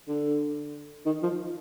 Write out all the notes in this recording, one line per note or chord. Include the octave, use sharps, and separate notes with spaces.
D3
D#3
F3